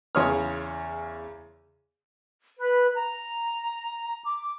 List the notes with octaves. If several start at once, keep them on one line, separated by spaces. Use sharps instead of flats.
E2 C#3 C#5 C6 D#6 F6
B4
A#5
D6